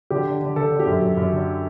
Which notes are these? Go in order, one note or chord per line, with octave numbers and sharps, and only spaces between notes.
D3 G4
D3
D3
D3 A4
D3
G4
F#2
F#2
F#2
D3